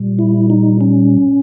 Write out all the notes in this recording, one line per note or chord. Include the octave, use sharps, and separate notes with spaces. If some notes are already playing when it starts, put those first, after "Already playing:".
Already playing: A#2 G3
E4
D#4
C#4